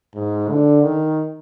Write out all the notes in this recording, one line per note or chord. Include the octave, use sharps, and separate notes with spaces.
G#2
D3
D#3